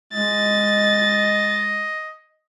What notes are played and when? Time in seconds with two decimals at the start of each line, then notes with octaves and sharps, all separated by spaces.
0.13 G#3 D#5 A6